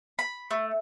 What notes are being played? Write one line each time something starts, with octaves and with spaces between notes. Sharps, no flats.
B5
A3